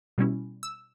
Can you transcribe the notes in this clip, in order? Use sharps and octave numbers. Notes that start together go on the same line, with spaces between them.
B2 G3 C#4 E4
E6